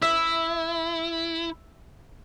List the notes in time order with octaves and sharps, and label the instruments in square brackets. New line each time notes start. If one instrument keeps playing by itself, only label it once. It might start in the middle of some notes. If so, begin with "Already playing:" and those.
[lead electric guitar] E4 [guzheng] E5